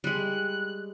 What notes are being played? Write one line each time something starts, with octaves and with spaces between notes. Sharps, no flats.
G3 G#3 F#6